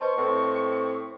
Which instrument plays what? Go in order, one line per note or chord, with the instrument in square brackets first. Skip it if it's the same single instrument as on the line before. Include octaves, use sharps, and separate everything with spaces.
[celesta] B4 D#5 A5 [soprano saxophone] C5 [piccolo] C#6
[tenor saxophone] A2 [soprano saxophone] C4